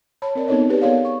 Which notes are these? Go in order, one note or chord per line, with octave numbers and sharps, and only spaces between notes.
C#5 A5 B5
C4 A#4 D5
B3 C4 D#4 A4 C#5 D#5
G4 G#4 B4 D5
B3 G#4 A#4 C#5 D5 F5
C#6